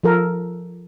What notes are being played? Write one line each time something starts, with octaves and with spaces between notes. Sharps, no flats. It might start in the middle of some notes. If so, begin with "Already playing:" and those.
F3 A4 A#4